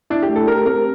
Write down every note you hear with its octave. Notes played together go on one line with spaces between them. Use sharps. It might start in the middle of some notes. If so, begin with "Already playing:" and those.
D4 E4
G4
A3
A4
G4 A#4
C4 A#4